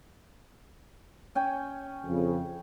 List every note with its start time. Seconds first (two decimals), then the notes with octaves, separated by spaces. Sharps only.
1.35 C#4 G5 G#5
2.05 F2 C#3